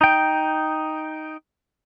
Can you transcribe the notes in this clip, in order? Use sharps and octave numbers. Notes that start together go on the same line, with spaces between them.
D#4 G5